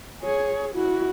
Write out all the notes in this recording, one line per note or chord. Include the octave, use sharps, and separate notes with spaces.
G#4 C#5
E4 F#4